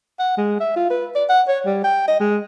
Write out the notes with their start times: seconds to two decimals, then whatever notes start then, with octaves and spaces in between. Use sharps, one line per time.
0.19 F#5
0.38 G#3
0.60 E5
0.76 F4
0.90 B4
1.16 D5
1.29 F#5
1.48 C#5
1.66 G3
1.84 G5
2.08 D#5
2.20 G#3